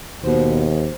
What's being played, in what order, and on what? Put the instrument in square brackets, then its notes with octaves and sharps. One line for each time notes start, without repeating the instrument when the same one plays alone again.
[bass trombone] D#2 [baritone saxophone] B2 [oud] C5